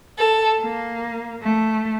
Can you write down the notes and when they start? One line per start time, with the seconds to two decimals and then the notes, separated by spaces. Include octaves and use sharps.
0.18 A4
0.61 A#3
1.42 A3